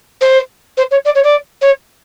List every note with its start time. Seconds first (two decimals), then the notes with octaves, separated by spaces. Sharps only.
0.21 C5
0.77 C5
0.91 C#5
1.05 D5
1.15 C#5
1.24 D5
1.62 C#5